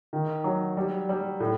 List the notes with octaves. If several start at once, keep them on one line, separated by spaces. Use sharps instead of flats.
D#3
F#3
G3
G3
A2